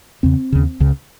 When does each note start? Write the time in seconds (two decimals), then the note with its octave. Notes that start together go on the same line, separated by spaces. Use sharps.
0.23 E2 C#3 C4
0.52 D#2 C#3
0.80 C#2 C#3